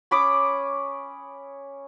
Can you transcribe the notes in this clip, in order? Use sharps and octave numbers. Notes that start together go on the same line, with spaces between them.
C#4 B5 D6 D#6